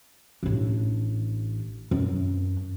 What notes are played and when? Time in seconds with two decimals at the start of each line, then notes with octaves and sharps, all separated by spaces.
0.43 A1 D4
1.91 F#2 D#3